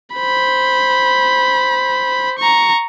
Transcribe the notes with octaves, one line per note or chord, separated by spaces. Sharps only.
C5 B5
A#5 C#6